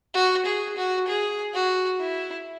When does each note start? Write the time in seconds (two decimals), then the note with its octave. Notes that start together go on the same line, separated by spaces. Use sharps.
0.14 F#4
0.46 G#4
0.77 F#4
1.07 G#4
1.54 F#4
2.00 E4